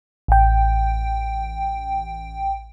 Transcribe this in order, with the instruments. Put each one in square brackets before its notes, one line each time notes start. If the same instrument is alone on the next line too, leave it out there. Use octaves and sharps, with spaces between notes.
[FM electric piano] A1 G5